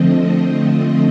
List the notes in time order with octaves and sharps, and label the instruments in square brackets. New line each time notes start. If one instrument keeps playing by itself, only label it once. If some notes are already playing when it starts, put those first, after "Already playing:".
Already playing: [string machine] D3 F3 A3 C4 D#5